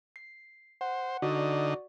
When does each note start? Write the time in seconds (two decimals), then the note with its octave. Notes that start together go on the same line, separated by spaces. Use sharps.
0.16 C7
0.81 C5 F#5
1.22 D3 D#4 F#4 D5